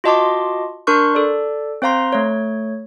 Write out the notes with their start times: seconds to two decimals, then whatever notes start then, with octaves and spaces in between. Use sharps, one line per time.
0.04 F4 F#4 D#5 A5 C6 D6
0.87 D4 A#4 C6 C#6 F#6
1.15 A4 D5
1.82 C4 C5 F5 A#5 C6
2.13 A3 C#5